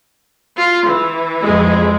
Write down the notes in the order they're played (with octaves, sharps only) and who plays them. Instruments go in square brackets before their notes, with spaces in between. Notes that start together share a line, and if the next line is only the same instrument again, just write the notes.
[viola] F4
E3
[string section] F2 G#3